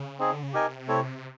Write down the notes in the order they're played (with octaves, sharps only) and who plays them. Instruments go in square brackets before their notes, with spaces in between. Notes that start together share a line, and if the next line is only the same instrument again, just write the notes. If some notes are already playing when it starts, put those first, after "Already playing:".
Already playing: [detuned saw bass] C#3
[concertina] C4 D#4 G#4
[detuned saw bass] D3
C#3
[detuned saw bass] C3 [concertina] D#4 G4 A#4 D#5 G#5
[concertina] A3 C4 E4 A4 C#5